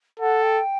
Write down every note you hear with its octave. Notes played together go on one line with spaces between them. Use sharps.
A4 F#5
G5